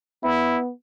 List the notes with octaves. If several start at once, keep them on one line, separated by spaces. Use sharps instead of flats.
B3 E4